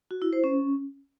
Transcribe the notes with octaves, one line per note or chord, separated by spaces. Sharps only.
F#4
E4
C5
C#4